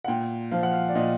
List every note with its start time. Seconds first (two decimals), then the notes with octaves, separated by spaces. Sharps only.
0.04 F#5
0.08 A#2 G5
0.51 F3 F5
0.63 F#5
0.73 F5
0.88 D5
0.95 A#2 D#5